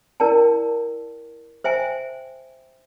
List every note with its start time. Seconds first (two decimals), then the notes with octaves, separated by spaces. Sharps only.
0.20 E4 A#4 D5 G5 A5
1.64 C5 E5 G5 G#5